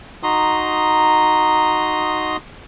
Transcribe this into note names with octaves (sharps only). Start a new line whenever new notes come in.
D#4 F#4 A#5 C6 D#6